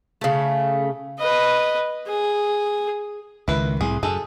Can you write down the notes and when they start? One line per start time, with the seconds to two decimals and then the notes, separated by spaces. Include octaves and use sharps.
0.21 C#3 A3
1.19 B4 D#5
2.07 G#4
3.48 C#2 D#3 E4 B4
3.81 C2 A2 G#4
4.03 F#2 G#4 A4